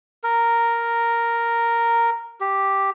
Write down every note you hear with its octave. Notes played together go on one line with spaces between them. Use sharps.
A#4
G4